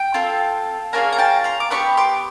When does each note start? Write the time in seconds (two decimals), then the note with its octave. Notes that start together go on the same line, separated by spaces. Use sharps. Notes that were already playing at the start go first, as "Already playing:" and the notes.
Already playing: G5
0.14 C4 F4 A4
0.93 A#3 C#4 F4 G#4 G#5 A#5
1.12 A#5
1.18 G5 A5
1.44 A#5 C6
1.60 D6
1.70 B3 D4 G4 B5 C#6
1.97 C6 D6